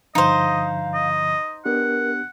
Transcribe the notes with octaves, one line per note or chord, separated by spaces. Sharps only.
G2 D3 F3 D#4 C5 D#5 F5
D#5
B3 D4 G4 A#4 F#5